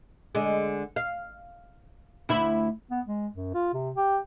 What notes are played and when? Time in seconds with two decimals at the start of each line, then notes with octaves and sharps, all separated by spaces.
0.35 D3 G#3
0.96 F5
2.29 D2 E4
2.91 B3
3.06 G#3
3.35 F#2
3.54 F4
3.73 C3
3.96 G4